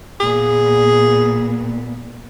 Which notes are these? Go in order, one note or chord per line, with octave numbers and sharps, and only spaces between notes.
A#2 B3 G#4